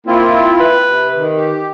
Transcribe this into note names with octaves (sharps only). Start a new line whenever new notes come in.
A#3 C4 E4 F4
B4
C3
D#3
G4